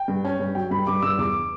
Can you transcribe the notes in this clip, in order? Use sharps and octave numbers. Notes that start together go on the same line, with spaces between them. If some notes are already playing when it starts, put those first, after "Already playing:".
Already playing: G5
G2
C#4
G2
F#3 G5
G2 B5
G2 D6
G2 E6
E2 D6